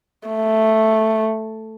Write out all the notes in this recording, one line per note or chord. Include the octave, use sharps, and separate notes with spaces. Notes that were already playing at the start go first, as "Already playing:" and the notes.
A3